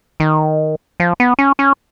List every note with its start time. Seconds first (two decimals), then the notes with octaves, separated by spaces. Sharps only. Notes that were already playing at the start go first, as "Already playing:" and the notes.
0.20 D#3
1.00 F3
1.20 B3
1.39 C#4
1.59 C#4